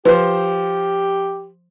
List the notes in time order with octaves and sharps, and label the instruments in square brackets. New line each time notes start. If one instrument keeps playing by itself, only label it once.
[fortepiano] F3 C5 [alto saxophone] G4 [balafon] B4